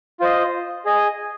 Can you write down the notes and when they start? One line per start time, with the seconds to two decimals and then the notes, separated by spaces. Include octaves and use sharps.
0.20 F4 C5 D#5
0.85 G#4 D#5 G#5